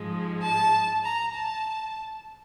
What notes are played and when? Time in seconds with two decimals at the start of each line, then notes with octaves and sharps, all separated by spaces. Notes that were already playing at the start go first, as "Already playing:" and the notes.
Already playing: G#2 F3 G#3
0.42 A5
1.03 A#5
1.33 A5